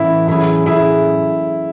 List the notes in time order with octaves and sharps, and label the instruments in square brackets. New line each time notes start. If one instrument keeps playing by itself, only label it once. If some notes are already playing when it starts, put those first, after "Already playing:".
Already playing: [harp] A2 E3 B3 C#4 F#4 [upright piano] E4
[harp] A2 F#3 C#4 G#4 [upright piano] E4
[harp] A2 F#3 C#4 G#4 [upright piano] E4